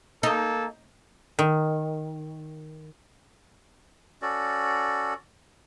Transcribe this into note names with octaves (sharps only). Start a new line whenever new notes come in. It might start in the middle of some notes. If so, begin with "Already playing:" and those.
A#3 D#4 A4
D#3
C#4 F#4 A4 D5